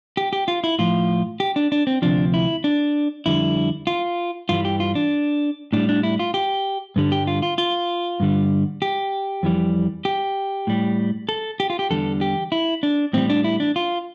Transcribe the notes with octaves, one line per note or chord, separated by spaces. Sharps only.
G4
G4
F4
E4
A2 F3 F4
G4
D4
D4
C4
D2 C3 F3 D4
E4
D4
F2 D3 G3 E4
F4
G2 E3 G3 F4
G4
F4
D4
A2 G3 D4
D4
E4
F4
G4
G2 D3 G3
G4
F4
F4
F4
G2 D3 G3
G4
F2 E3 G3
G4
A2 G3
A4
G4
F4
G4
E2 D3 G3 A4
G4
E4
D4
A2 E3 G3 C4
D4
E4
D4
F4